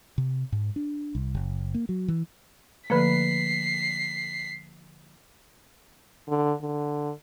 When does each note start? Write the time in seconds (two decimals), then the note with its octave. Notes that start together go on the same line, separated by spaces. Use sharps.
0.18 C3
0.52 G#2
0.76 D4
1.15 C2
1.35 F#1
1.74 A#3
1.89 F#3
2.08 E3
2.90 D3 F3 A3 A#3 B4 B6 C7
6.28 D3
6.62 D3